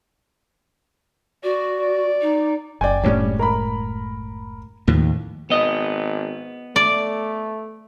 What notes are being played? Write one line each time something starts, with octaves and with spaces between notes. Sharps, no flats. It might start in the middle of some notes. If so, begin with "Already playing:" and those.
F#4 D5
D5
D#4
F#1 D5 G5 G#5
D2 A2 G3 G#3 C#4 D4
A#4 A#5 B5
D#2 A2 D#3 F3
G#1 B3 D#5
A3 D5